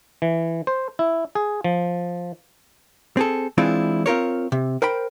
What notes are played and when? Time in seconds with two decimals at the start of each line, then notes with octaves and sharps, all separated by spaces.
0.22 E3
0.67 C5
0.99 E4
1.35 G#4
1.64 F3
3.17 C4 G#4 A4
3.58 E3 G#3 C4 D4 E4 F4
4.06 C4 F4 A#4 C#5
4.52 C3
4.82 A#4 C5 G5 B5